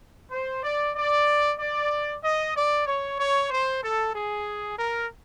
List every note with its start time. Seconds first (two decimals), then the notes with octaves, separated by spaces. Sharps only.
0.31 C5
0.63 D5
0.95 D5
1.59 D5
2.23 D#5
2.54 D5
2.86 C#5
3.18 C#5
3.50 C5
3.82 A4
4.14 G#4
4.77 A#4